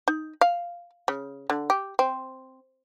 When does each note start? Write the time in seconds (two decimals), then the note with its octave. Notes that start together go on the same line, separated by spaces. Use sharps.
0.08 D#4
0.41 F5
1.08 C#3
1.50 D3
1.70 G4
1.99 C4